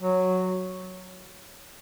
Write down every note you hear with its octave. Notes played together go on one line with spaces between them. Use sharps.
F#3